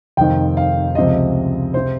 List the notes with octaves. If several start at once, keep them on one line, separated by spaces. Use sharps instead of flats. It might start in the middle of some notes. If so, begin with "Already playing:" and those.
F1 F2 D#3 G5
F5
C#2 C3 F3 D#5
C3 C5